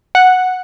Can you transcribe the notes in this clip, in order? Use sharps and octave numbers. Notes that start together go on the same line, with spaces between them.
F#5